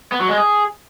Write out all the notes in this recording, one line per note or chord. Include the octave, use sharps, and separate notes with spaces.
B3
F#3
G#3
G#4